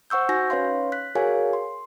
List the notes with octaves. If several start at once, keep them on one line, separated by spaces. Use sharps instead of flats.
C5 F#5 C#6 E6 G6
D#4 F#4 G#5 G6 A#6
C#4 B4 C#5 F5 C6
F#6 B6
F#4 G#4 A#4 C#5 F5 G#5
C6